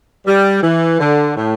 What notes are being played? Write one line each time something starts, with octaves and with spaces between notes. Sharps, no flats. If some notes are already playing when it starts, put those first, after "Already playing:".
G3
E3
D3
A2